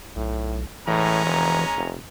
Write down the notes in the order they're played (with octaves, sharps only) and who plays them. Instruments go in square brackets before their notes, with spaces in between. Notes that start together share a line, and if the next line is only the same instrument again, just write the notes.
[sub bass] B1 [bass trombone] A2
[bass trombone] A2 [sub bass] E3 [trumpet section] G#3 C#4 A#5
[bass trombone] F1
F1